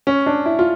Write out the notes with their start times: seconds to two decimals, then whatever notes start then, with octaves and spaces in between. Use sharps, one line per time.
0.07 C#4
0.26 D4
0.46 E4
0.59 F4